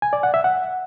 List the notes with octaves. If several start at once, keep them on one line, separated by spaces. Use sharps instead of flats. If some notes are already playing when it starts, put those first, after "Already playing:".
G#5
D5
F#5
E5
F#5